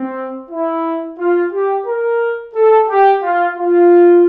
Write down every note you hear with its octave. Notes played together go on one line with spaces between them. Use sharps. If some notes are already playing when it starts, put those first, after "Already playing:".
Already playing: C4
E4
F4
G4
A#4
A4
G4
F4
F4